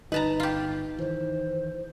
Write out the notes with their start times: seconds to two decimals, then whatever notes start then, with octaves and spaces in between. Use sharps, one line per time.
0.12 G1 D#4 B4 A5 A#5
0.40 F4 G4
0.99 D#3 E3 C5